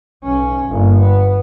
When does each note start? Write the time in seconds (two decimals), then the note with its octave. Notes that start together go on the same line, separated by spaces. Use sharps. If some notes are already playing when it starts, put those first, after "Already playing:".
0.24 B1 C#4
0.67 G1 A#3
1.00 B3